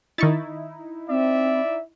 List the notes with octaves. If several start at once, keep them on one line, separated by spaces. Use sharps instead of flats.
D#3 D#4 E4 C#6 A6
C4 D5 E5